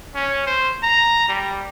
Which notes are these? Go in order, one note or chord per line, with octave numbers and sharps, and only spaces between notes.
C#4
C5
A#5
G3